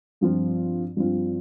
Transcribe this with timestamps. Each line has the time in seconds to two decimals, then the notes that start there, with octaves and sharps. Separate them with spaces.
0.21 G2 F3 C4 F4
0.96 G2 F3 C4 F4